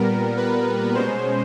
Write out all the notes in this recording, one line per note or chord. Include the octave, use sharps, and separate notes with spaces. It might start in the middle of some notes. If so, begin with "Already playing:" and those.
Already playing: A#2 G3 B3 A#4
B4
B2 G#3 C#4 C5